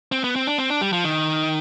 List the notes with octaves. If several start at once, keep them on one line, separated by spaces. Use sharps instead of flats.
C4
B3
C4
D4
C4
D4
G3
F3
D#3